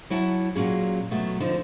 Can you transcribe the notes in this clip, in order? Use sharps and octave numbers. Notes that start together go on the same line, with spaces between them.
F#3 E4 F#5 A5
A#2 F#3 C#4 G#4
B2 F#3 A3
D3 F3 D#4